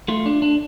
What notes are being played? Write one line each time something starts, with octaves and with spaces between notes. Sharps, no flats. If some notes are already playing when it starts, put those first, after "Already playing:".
A3 F4
D4
D4